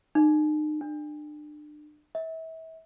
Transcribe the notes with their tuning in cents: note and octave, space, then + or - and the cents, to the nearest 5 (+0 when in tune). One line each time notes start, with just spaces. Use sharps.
D#4 -35
D4 +35
E5 -35